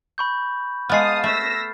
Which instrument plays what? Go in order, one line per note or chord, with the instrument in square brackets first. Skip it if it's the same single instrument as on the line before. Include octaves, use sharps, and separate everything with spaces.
[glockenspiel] B5 C#6 G6
[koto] G#3 B3 [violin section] F5 A5 D#6 [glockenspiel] F6 A6 C7
[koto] A3 [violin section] E6 A#6 B6